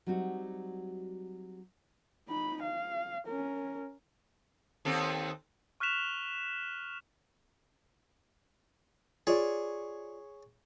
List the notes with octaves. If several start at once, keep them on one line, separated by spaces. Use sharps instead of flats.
F#3 G3 C4 D#4 F#4
D#4 B5
F5
C#4 A#4
D#2 C4 A4
C#6 F6 F#6 B6 E7 F7
F4 G#4 C#5 D5